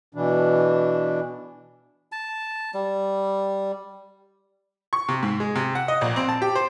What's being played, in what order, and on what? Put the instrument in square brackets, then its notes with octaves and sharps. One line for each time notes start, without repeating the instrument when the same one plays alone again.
[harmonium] B2 E3 D4
[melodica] A5
G3
[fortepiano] C#6
C3
G#2
G#3
C3
F#5
D#5
A#1
C4
A5
G4
C5